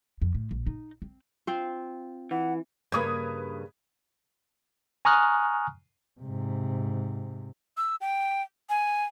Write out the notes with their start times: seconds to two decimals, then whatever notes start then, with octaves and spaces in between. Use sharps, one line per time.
0.22 F2
0.35 A2
0.51 A#1
0.67 D#4
1.02 C4
1.47 C4 F4 C5
2.31 E3 F#5
2.92 G2 C#3 A#3 B4 D#6 G#6
5.05 G#5 A#5 C#6 D#6 F6 F#6
6.21 G#2 C3
7.77 E6
8.01 G5
8.70 G#5